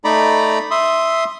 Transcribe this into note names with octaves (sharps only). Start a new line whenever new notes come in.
A3 D#4 D5 A#5 B5
E5 C6 D#6